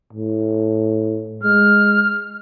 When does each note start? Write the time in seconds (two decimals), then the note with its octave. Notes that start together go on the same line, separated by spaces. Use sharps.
0.13 A2
1.43 G#3 F6